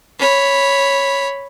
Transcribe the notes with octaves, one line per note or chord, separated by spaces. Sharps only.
C#5 B5